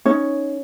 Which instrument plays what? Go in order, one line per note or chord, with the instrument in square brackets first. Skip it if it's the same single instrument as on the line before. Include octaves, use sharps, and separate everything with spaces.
[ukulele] C#4 D#4 C#5